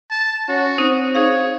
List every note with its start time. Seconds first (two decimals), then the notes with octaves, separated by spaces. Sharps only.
0.11 A5
0.49 C#4 F#4
0.78 C4 D#4 C5
1.15 D#4 G#4 C#5 F5